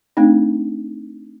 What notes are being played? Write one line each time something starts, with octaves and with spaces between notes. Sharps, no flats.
A3 C4 D4 D#4